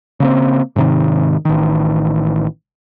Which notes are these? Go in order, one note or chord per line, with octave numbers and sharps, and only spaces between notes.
C#3 A#3 C4
G#2 C3 D#3
A1 D#3